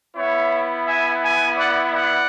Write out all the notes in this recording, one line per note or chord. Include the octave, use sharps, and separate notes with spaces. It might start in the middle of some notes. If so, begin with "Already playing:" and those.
B3 E4 C#5 E5
E5 G#5
E5 G#5
D5 F#5
D5 F#5